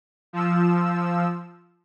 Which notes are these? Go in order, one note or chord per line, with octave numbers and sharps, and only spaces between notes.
F3 E6